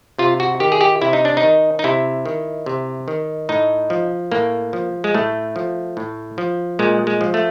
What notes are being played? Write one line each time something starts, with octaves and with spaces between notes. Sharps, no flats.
C3 F4
F#4
D#3 G4
G#4
G4
C3 E4
D#4
D4
D#4
D#3
D#4
C3 E4
D#3
C3
D#3
A2 D#4
F3
A2 A#3
F3
G#3
A2 A3
F3
A2
F3
A#2 G#3
G#3
F3
A3